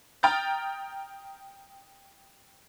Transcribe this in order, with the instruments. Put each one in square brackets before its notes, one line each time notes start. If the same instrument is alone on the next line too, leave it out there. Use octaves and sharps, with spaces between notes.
[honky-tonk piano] G5 A#5 D#6 F6 G6 A6